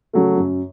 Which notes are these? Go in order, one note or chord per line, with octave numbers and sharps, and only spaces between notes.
C#3 F#3 A3
F#2